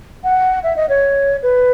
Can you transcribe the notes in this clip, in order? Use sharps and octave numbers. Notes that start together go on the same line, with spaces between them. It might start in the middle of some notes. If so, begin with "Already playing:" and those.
F#5
E5
D#5
C#5
B4